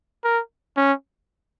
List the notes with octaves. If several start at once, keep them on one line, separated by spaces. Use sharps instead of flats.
A#4
C#4